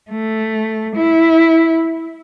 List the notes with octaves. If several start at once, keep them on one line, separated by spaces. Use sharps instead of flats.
A3
E4